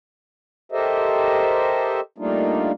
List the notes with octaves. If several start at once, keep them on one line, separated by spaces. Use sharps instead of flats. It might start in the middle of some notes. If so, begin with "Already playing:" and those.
G4 A4 A#4 C5 D#5 E5
G3 A3 A#3 D4 D#4 F4